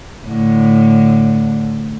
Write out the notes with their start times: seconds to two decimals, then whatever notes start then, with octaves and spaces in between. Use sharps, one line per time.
0.24 A2 D3